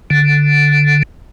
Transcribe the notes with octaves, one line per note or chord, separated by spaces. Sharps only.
D3